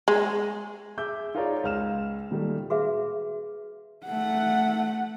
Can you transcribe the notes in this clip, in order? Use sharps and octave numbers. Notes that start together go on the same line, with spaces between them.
G#3
G#4 E5 D6 E6 G6
D#4 F4 G#4 A#4 C#5 D5
C#2 F5 F6 E7
A#2 D#3 G3 A3
F#4 G#4 B4 E5 F5
A3 F#5